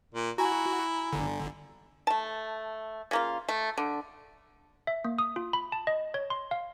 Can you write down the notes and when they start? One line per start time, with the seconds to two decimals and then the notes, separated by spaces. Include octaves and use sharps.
0.14 A#2
0.38 E4 F#4 G#5 A#5
1.13 G1 D3
2.07 A3 A5
3.11 C#3 A#3 F4
3.49 A3
3.78 D3
4.87 E5
5.05 A#3
5.19 D#6
5.36 F4
5.53 B5
5.72 A5
5.87 D#5
6.14 C#5
6.30 C6
6.51 F5